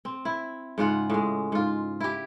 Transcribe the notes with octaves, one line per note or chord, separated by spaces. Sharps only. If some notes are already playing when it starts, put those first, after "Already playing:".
C4
E4
G#2 C#3 F4 F#5
A2 G#3
G#2 F4
E4 G4